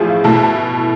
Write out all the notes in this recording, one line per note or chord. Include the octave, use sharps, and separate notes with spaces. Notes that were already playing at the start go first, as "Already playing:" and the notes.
Already playing: A1 A2 F3 F4 G#4
F5
B2 A3 E4 A5
A5